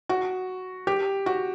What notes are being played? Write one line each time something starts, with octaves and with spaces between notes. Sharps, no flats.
F#4
G4
F#4